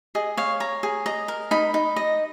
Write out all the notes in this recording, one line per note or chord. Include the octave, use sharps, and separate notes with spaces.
G#4 D#5
C#5 F5
C#5 A#5
G#4
D#5 A#5
A#4
D#4 B5
D#4
D#5